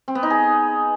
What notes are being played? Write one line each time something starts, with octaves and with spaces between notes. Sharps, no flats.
C4
B3
D#4
G#4